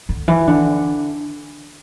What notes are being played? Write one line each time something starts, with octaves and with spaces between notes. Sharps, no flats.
D3
E3
D3